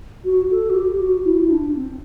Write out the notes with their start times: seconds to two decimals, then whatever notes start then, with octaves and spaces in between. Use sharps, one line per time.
0.25 F#4
0.51 A4
0.70 F#4
0.75 G4
1.00 F#4
1.25 E4
1.34 F#4
1.40 E4
1.50 D4
1.75 C4